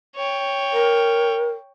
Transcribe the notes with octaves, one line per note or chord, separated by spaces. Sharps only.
C#5 G5
A#4